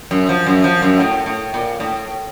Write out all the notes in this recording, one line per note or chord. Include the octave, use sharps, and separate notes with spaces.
F#2
F3
F#2
F3
F#2
A2
A2
A#2
A2